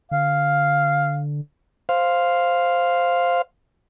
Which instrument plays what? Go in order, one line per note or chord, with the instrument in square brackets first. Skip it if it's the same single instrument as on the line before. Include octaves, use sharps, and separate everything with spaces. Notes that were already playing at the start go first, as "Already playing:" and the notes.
[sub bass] D3 [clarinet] F5
[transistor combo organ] C5 F5